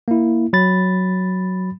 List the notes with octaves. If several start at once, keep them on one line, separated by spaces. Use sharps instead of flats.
A#3 E4
F#3 B5 A6